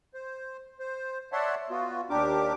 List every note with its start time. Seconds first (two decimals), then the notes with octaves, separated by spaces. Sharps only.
0.14 C5
0.79 C5
1.32 C#5 D5 E5 F#5 A5 C6
1.70 B3 F4 F#4
2.10 D#2 D4 G4 A#4 D6